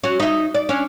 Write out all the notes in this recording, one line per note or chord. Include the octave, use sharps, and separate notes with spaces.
C#4 F#4
D#4 E5
D5
C#4 D4